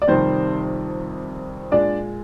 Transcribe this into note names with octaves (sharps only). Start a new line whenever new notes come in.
D5
F2 C3 D#3 G3 C4 C5
A#2 G#3 D4 D5